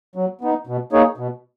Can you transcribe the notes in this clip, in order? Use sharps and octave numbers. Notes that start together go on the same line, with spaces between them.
F#3
B3 D#4
B2
A#3 D#4 G#4 C#5
B2